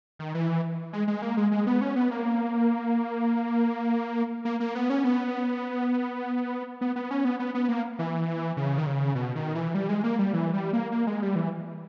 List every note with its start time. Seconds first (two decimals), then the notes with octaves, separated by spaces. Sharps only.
0.19 D#3
0.34 E3
0.93 G#3
1.08 G#3
1.22 A#3
1.37 G#3
1.51 G#3
1.67 B3
1.81 C#4
1.96 B3
2.11 A#3
4.45 A#3
4.60 A#3
4.75 B3
4.90 C#4
5.04 B3
6.81 B3
6.96 B3
7.11 C#4
7.25 B3
7.39 B3
7.55 B3
7.68 A#3
7.99 E3
8.57 C#3
8.78 D#3
8.86 C#3
9.15 B2
9.36 D#3
9.55 E3
9.74 G3
9.89 G#3
10.04 A#3
10.19 G3
10.33 E3
10.53 G3
10.73 A#3
10.92 A#3
11.07 G#3
11.22 G3
11.36 E3